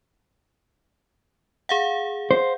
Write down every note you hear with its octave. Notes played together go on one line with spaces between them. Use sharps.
G#4 F5 F#5
C5